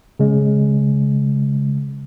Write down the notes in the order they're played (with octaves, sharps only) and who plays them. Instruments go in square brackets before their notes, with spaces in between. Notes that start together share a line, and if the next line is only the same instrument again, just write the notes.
[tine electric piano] C#3 G#3